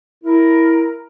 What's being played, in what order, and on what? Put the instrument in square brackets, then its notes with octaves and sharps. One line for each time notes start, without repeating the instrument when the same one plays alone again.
[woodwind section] E4 A#4